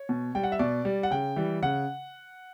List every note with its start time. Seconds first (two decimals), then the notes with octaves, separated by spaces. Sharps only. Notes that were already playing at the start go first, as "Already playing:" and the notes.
Already playing: C#5
0.09 B2
0.35 G3 G5
0.43 F#5
0.52 E5
0.59 B2 D5
0.85 G3
1.03 F#5
1.11 C#3 G5
1.36 E3 G3
1.62 C#3 F#5